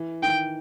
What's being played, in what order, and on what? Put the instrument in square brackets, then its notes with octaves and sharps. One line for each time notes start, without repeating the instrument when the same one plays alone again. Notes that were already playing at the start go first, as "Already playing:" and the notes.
Already playing: [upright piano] E3
[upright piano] D#3 [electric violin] G5